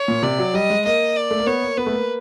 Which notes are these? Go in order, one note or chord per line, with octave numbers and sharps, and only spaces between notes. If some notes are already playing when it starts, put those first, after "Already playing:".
Already playing: C#5
A#2
C3 D5
F#3
G3 D#5
G#3
A#3 D#5
D5
A3
A#3
B3 C#5
A#3
B3 B4
A3
A#3